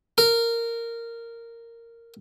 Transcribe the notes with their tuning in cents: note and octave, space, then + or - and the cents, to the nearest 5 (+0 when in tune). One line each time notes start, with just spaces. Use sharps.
A#4 -10